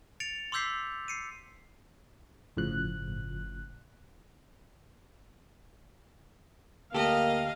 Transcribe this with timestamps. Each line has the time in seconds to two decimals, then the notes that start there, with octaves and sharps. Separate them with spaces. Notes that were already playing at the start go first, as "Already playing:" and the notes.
0.20 A6 C#7 D7 F7
0.52 C6 D6 E6 G6 B6 C7
1.08 C7 C#7 D#7
2.57 G1 A2 C#3 F3 F#6
6.94 D2 A#3 G4 A4 D#5 F5